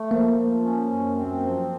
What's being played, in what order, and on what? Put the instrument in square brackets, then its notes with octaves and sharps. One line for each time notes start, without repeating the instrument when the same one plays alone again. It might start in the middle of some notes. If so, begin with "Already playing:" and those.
Already playing: [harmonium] A3
[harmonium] F3 [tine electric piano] A#3
[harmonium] F3
C#4
F#2
C4
F3